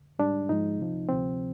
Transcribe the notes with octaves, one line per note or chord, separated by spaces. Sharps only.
G#2 G3 D4
G#2 F3 G#3 D#4
C2 C3 F3
D2 C3 F3 C4